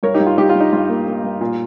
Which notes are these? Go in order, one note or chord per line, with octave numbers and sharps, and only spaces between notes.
G2 A#4 C#5
D#4 G4
G2
F4
G2 D#4 G4
F4
G3
D#4
G2 F4
A#3
A#3
G2
A#2